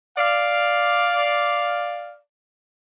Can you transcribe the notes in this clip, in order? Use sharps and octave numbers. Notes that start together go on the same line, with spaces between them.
D5 F5